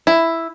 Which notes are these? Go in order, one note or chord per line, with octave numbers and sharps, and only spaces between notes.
E4